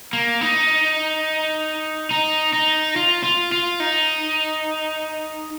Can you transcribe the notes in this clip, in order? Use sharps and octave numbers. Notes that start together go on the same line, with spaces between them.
A#3
D#4
D#4
D#4
F4
F4
F4
D#4